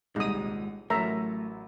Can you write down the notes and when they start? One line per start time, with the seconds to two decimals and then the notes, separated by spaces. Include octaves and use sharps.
0.16 D#1 C2 A#2 G#3 D#4 D#6
0.90 A1 F#3 A3 A#4 E5 A#5